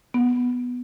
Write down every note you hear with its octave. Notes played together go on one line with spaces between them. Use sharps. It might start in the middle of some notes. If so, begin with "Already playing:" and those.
B3